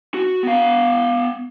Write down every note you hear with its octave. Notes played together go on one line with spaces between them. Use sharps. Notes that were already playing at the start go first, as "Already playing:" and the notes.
F#4
B3 F5